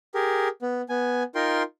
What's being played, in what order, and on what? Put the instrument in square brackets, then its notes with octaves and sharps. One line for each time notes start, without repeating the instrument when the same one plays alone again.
[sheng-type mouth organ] G4 G#4 A#4
B3
B3 G#5
D#4 F4 A#4 G5 C6